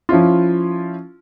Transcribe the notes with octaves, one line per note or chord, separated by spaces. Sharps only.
F3 C#4 E4 F4